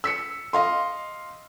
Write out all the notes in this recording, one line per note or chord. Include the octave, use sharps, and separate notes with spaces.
E6 B6 C#7
D#5 F5 C6